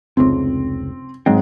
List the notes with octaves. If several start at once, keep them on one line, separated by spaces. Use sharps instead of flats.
F1 C#2 C4
G#2 F#3 G#3 C4